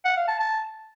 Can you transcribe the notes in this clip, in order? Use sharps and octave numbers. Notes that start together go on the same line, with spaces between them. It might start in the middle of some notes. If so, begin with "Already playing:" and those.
F#5
F5
A5
A5